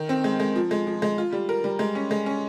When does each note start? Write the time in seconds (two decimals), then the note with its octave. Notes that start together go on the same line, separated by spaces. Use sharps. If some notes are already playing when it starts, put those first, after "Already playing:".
Already playing: D#3
0.09 C4
0.24 G#3
0.40 G#3
0.56 F3
0.71 G#3
0.87 F3
1.02 G#3
1.18 F4
1.33 G3
1.49 A#4
1.64 G3
1.79 G#3
1.95 C#4
2.11 G#3
2.26 C#4